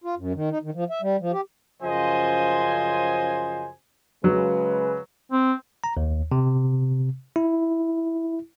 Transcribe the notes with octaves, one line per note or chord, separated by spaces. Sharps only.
F4
F#2
D#3
D#4
D#3
F3
E5
G3
F3
G4
F#2 C#3 F3 C5 D#5 G#5
C#3 F#3 G#3 B4
C4
A#5
D#2
C3
E4